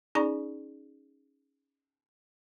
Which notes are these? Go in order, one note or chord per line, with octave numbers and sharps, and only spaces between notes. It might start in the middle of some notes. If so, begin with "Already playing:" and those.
C#4 D#4 G#4 D5 A#5 C#6